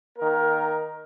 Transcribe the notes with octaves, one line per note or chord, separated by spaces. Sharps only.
D#3 A#3 A#4